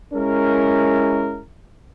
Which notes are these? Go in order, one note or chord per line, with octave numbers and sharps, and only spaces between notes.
G#3 C#4 E4 A#4